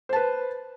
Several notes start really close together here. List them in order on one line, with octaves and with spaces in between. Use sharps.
C5 A5 B4